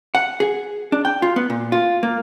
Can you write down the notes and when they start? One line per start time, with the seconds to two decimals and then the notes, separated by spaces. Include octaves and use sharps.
0.15 F#5
0.40 G#4
0.92 D4
1.05 G5
1.22 F4
1.36 B3
1.50 A#2
1.72 F4
2.03 A#3